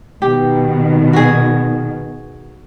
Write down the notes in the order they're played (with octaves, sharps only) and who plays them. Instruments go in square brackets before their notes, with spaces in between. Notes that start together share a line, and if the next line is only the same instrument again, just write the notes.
[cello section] B2 D#3 [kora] G4
[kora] F#4 G#4